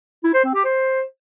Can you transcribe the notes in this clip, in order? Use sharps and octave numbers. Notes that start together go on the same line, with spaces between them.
E4
C5
C4
G4
C5